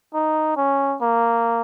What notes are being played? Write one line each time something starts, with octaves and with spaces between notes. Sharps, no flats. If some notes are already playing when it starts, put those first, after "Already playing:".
D#4
C#4
A#3